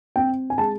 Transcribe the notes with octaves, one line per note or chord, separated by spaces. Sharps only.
C4 G5
G#5
G#3 A5